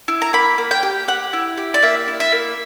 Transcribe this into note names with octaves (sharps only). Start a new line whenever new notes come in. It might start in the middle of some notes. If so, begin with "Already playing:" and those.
E4
A#5
A#3 B5
A#3
G5
G4
G4 F#5
E4
G4
D5
A#3 E5
E4
E5
A#3